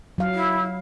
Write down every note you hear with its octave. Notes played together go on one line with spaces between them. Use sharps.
F#3 F5
E4